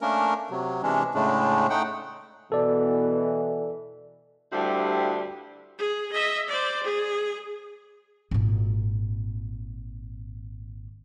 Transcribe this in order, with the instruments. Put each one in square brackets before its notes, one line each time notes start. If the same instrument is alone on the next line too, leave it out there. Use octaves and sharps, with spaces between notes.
[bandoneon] A3 A#3 C#4 D4 A#4
C3 F#3
C3 E3 G#3 C#4 D4
A2 C#3 G#3 A3 D4
A3 D#4 F#5 G5
[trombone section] B2 E3 [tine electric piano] A4 D5
[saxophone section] D2 G2 G3 E4 G4 C5
[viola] G#4
D#5 E5
C5 D5
G#4
[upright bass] G#1 A#2